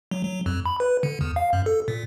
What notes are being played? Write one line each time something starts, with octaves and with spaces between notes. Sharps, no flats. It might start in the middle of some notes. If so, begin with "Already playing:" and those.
F#3
F#3
F2
B5
B4
D3
E2
F5
F#2
A4
A#2